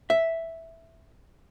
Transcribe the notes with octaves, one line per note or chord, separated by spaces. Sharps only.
E5